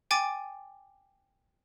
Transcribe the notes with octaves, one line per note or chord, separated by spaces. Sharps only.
G5 G#5 D6 A6